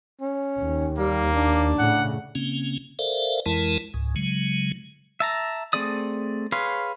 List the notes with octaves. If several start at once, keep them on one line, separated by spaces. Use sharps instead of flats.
C#4
D#2
G3 A#3
D4
A2 C#3 F#5
C#3 A#3 C4 C#4
A4 A#4 C5 D5 E5 F5
F2 E3 G#3 E4 A#4 A5
C#2 G#2
C#3 F#3 G#3
E5 A5 A#5
A3 C4 G#4 D5 D#6
G#4 B4 C#5 F5 C6